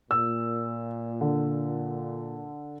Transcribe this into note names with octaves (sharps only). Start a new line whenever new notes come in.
A#2 E6
D3